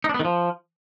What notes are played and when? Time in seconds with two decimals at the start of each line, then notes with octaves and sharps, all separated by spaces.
0.04 D#4
0.09 D4
0.14 B3
0.20 D#3
0.25 F3